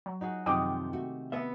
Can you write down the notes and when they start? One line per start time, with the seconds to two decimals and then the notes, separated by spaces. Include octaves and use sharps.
0.06 F#3
0.21 D#4 F#4 G#4
0.46 F#2 C3 D#3 F3 G#3 G5 D6 D#6
0.93 A3 F#4
1.32 B3 E5